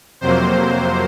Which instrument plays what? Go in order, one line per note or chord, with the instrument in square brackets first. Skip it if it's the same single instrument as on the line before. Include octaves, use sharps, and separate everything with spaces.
[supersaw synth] F2 C3 F#3 A#3 C5